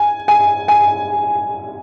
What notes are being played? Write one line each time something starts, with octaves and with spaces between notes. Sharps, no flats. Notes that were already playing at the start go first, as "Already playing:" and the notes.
Already playing: G#5
G#5
G#5